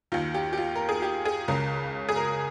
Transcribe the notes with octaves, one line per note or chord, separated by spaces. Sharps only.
D#2 D#3 F4
G4
G4
F4
A#4
G#4
G4
G#4
C#2 C#3 A#4
G#4
A#4